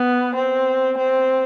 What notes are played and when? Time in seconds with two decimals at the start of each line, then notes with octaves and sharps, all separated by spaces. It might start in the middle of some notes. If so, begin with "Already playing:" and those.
Already playing: B3
0.35 C4
0.98 C4